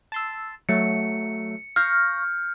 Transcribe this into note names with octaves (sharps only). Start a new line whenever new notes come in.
A5 C6 E6
F#3 A3 C#7
F5 C#6 F6 G6 A#6